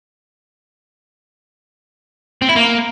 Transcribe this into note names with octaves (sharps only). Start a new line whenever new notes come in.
C4
E4
A#3